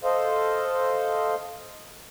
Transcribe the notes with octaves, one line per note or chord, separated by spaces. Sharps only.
A4 C5 D#5 F5